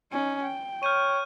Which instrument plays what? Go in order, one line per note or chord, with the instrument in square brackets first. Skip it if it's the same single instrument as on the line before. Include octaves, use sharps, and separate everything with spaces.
[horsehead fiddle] C#4 D#4
G5
[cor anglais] C#5 [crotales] F6 G6 D#7